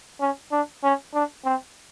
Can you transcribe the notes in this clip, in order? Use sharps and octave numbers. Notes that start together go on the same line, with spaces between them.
C#4
D4
C#4
D4
C4